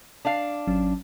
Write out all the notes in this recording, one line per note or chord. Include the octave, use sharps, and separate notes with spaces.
D4 D5 F5
G#1 F#3 C#4